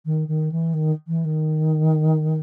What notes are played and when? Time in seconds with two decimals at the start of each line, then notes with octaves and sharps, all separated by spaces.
0.05 D#3
0.27 D#3
0.51 E3
0.73 D#3
1.07 E3
1.24 D#3